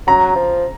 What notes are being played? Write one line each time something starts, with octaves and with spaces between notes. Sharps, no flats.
F#3 A#5
F3